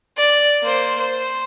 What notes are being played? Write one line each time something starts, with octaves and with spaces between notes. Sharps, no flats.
D5
A#3 C5
C5